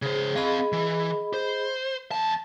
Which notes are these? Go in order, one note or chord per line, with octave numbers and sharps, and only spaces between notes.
C#3 G#4 C5
C4 G#4 D#5 F5 B5
E3
C5
E2 A5